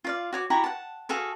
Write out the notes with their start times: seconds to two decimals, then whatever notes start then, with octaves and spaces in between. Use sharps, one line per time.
0.04 F4 D5 F5
0.33 F#4 C#5 D6
0.50 E4 F#4 G4 A#5
0.64 F#5 A5
1.09 F#4 G#4 A4 F5